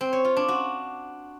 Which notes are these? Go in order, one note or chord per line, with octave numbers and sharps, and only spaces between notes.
C4
C#5
F4
D4
F#4